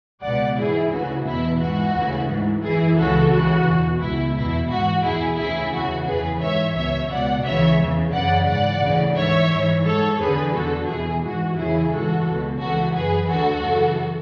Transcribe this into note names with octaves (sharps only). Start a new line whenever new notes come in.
C#2 B2 D5 F#5
G#2 E3 E4 G#4
D2 C#3 E3 F#4
E2 B2 E4
G#2 E3 F#4
D2 C#3 E3
G#2 E3
F#2 E3 E4 G#4
C#2 C#3 E3 F#4 A4
C#2 C#3 E3 F#4
E2 B2
C#2 B2 E4
E2 B2 E4
G#2 E3 F#4
E2 B2 E4 G#4
D2 C#3 E3 E4 G#4
E2 C#3 E3 F#4
E2 C#3 E3 G#4 B4
G#2 E3 C#5 E5
C#2 B2 C#5 E5
C#2 B2 D5 F#5
C#2 C#3 E3 C#5 E5
E2 C#3 E3
F#2 C#3 E3 D5 F#5
G#2 E3 D5 F#5
D2 C#3 E3
G#2 E3 C#5 E5
G#2 E3
G#2 E3 A4 C#5
E2 D3 G#4 B4
E2 D3 F#4 A4
E2 B2 E4 G#4
G#2 E3 F#4
E2 C#3 E3 E4 G#4
G#2 E3 F#4 A4
C#2 B2
C#2 C#3 E3 F#4 A4
F#2 E3 G#4 B4
D2 D3 F#4 A4
F#2 C#3 E3